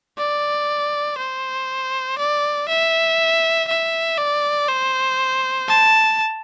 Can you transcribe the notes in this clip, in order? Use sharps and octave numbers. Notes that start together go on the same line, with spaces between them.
D5
C5
D5
E5
E5
D5
C5
A5